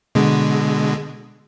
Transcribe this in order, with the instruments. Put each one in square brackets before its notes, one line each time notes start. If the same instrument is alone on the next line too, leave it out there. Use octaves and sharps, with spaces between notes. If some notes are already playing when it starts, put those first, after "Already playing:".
[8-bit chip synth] B2 D3 G#3